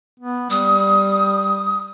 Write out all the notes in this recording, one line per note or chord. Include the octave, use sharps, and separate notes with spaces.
B3
G3 D#6